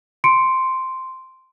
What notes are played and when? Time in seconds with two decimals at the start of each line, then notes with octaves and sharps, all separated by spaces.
0.24 C6 C#7 D7